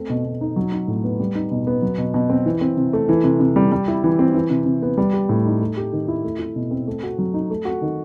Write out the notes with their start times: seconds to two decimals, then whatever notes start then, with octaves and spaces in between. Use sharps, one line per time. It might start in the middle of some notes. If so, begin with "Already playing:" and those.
Already playing: A3 C4
0.10 B2
0.25 B2
0.41 D#4
0.56 F#3
0.72 D#4
0.88 A2
1.04 B3
1.20 G3
1.35 D#4
1.51 B2
1.67 B3
1.82 F#3
1.98 B2
2.14 B2
2.30 C4
2.46 E3
2.61 C4
2.77 C3
2.93 A3
3.09 E3
3.24 C3
3.40 C3
3.56 G3
3.72 G3
3.88 E4
4.04 E3
4.19 C4
4.34 E3
4.50 C3
4.66 C3
4.82 B3
4.98 G3
5.13 G4
5.29 A2
5.46 D#4
5.61 A3
5.77 G4
5.93 D#3
6.08 E4
6.24 A3
6.39 E4
6.56 B2
6.71 C4
6.87 A3
7.03 F#4
7.18 F#3
7.34 D#4
7.50 A3
7.65 F#4
7.82 D#3